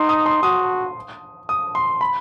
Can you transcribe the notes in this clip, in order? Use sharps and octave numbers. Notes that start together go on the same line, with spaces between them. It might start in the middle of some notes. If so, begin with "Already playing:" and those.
Already playing: D#4 C6
D#6
C6
F#4 D#6
D#6
C6
B5